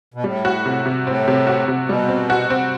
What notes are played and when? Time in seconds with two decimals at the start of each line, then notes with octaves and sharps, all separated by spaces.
0.14 B2
0.24 A2 G3
0.45 F#4
0.66 C3
0.86 C3
1.06 A2 C4
1.28 C3
1.47 F#4
1.68 C3
1.89 B2 G3
2.09 C4
2.30 F#4
2.50 C4